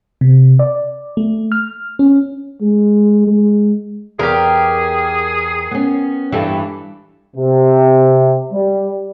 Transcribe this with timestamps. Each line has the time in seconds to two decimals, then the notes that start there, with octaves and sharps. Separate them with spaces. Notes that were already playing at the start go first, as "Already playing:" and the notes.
0.21 C3
0.59 D5
1.17 A3
1.52 F6
1.99 C#4
2.61 G#3
3.27 G#3
4.19 E2 G4 G#4 A#4
5.71 B3 C#4
6.32 G2 E3 G3 A4
7.36 C3
8.53 G3